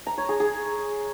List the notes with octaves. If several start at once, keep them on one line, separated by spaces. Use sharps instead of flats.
A#5
C#5
G#4
G#4